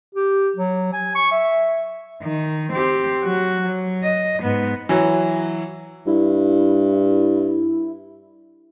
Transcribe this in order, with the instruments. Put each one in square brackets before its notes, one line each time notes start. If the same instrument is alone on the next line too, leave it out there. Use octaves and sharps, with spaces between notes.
[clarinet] G4
F#3
G#5
C#6
E5
[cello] D#3
C4 G4
F#3 F#4
F#3
D#5
G#2 B3
[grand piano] E3 F#3
[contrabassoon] G2 [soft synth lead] E4